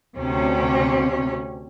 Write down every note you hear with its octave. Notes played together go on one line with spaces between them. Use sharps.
D2 C3 C#4